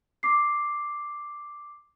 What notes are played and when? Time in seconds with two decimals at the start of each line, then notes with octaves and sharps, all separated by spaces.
0.23 D6 C7